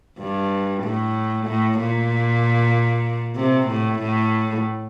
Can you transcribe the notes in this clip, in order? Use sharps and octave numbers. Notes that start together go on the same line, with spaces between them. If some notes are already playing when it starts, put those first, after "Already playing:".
G2
A2
A2
A#2
C3
A2
A2